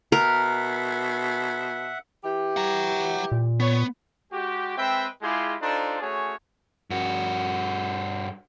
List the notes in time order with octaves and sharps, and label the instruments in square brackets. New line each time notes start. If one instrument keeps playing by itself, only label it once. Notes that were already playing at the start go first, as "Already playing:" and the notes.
[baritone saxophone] B2 [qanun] A#4 [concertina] E5 F#5
[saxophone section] E3 G4
[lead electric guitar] F#5 A#5
[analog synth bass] A#2
[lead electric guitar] B3 [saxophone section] C#5
[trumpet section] G#3 F#4 G4
G#3 C4 B4 E5 G5
G#3 E4 F4 G4 G#4
D4 D#4 F4 A4 C5
A3 C#4 F#4 G#4 C#5
[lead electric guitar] G2 F#4